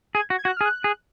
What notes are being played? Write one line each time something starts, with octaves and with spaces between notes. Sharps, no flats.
G#4 G#6
F#4
G#6
F#4
F#6
G#4 F6
F#6
G#4